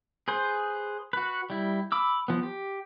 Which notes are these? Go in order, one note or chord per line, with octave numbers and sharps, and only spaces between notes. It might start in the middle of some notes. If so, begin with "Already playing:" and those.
G#4 B4 C5
F#4 B4
G3 E4
B5 D6 E6
F3 B3
G4